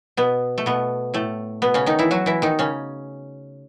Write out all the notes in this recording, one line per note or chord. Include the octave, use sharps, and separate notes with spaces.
B2 B3
A3
B2 B3
A2 A3
B2 B3
C#3 C#4
D#3 D#4
E3 E4
F#3 F#4
E3 E4
D#3 D#4
C#3 C#4